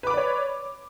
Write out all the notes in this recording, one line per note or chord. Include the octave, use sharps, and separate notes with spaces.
B4 C#5 D5 B5 D6